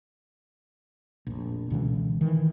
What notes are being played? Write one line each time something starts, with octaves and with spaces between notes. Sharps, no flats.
F1 A#1
C#2 B2 D3 E3
D#3 E3